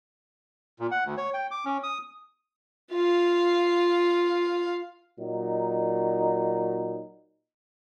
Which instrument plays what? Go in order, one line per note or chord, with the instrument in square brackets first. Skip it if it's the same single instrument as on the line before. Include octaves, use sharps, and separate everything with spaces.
[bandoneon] A#2
F#5
D2
C#5
G5
D6
C#4
D#6
[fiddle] F4 F5
[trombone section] A#2 F#3 D#4